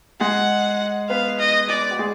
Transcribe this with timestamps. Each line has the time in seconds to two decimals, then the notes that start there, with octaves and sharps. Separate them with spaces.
0.20 G#3 G#4 F#5
1.09 B3 B4 F5
1.39 D#5
1.69 D5
1.91 F#4
1.99 G#3 G#4